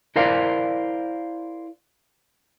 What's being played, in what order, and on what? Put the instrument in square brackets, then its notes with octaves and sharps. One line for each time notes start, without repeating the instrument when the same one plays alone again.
[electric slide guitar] E4 A#4 C5 D5 F5